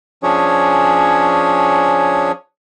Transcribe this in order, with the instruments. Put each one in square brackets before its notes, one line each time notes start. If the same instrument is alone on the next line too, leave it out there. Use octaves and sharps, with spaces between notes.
[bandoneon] F3 C#4 D4 G#4 C#5